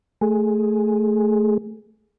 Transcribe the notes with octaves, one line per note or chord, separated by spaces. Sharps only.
A3 G#4